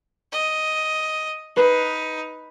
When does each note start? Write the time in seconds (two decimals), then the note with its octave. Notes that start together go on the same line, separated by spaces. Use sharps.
0.32 D#5
1.57 D#4 B4 C7